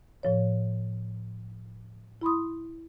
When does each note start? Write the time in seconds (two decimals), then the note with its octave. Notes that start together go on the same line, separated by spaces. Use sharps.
0.23 A2 F3 C#5
2.21 E4 B5 C6 D#6